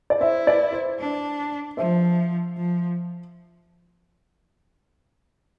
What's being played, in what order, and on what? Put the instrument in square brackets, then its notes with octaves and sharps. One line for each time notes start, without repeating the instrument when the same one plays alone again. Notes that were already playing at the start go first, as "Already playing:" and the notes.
[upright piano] D5
[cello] E4 [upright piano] C5 E5
[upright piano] B4 D5
C5
[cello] D4
[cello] F3 [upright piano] C5 E5
[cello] F3